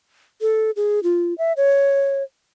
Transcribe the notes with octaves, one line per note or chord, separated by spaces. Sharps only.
A4
G#4
F4
E5
C#5